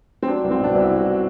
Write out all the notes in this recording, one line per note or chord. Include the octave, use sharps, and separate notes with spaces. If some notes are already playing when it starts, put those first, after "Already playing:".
C4
F#3 D4
C2
C4
B2 D4
C2 E4
C2
F#4